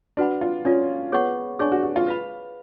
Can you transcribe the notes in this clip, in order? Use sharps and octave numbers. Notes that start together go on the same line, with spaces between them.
D4 F#4 B4 F#5 B5
F4
C#4 F4 A4 D5 G#5
B3 G#4 C#5 F#5 C#6
D4 G#4 C#5 G#5 C#6
F#4
F#4
F4
B4 F5 B5